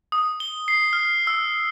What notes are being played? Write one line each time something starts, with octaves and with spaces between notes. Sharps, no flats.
D#6
G7
C7
F6
E6